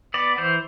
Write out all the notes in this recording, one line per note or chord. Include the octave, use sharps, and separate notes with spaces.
B3 D5
E3 C5